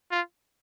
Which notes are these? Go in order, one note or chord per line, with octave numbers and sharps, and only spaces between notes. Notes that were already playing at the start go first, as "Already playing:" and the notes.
F4